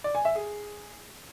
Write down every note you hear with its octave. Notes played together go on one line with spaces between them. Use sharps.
D5
G#5
E5
G#4